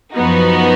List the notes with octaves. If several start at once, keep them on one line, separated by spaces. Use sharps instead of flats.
F#2 F3 B3 D#4 F#4